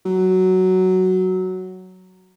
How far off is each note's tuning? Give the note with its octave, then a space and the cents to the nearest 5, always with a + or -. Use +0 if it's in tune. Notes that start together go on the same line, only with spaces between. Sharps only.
F#3 +5